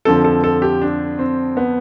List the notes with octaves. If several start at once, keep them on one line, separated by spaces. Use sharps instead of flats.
F2 D3 F3 A4
A4
A4
G4
D4
C4
B3